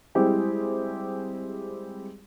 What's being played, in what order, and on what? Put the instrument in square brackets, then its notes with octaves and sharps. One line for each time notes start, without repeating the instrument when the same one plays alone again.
[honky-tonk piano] G3 G#3 C4 E4 G4 G#4